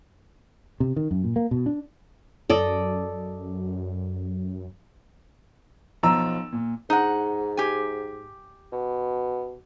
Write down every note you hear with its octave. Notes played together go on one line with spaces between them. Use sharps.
C3
D#3
F#2
A#2
A#3
B2
D4
F#2 A4 D5 D#5
B1 F3 A#5 E6
A#2
G#2 D#4 F#5
G4 G#5
B2